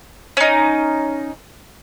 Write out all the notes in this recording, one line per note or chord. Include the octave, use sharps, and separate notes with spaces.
C#4 D#4